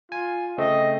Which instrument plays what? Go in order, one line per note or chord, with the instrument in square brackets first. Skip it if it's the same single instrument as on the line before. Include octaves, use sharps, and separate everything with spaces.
[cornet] F4 [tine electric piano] G#5
[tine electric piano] C#3 A3 C4 [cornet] D#5